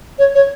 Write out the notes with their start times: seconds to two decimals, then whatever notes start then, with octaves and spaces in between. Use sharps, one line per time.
0.19 C#5
0.35 C#5